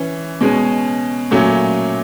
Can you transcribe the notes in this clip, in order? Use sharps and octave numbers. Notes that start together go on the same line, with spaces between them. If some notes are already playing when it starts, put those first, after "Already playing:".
Already playing: E3 C#4
B2 G#3 C#4
A#2 F#3 A3 C#4